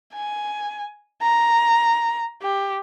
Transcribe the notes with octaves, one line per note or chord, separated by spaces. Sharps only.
G#5
A#5
G4